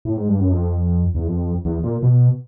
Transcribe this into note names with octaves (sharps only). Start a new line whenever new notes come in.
A2
G#2
G2
F#2
F2
E2
F2
E2
A#2
B2